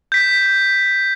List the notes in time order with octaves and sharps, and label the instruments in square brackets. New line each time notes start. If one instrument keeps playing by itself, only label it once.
[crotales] G6 B6